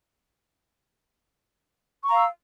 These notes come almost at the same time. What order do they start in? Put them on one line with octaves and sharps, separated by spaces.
C#6 A#5 F5 E6